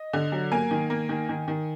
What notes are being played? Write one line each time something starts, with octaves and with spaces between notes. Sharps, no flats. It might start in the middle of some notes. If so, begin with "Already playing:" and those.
Already playing: D#5
D3
F#3
A#3 G#5
D#3
A#3
D#3
D#3
D#3